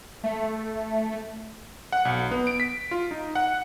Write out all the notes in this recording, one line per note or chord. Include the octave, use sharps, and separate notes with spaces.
A3
F#5
B1
B3
D7
B6
F4
D#4
F#5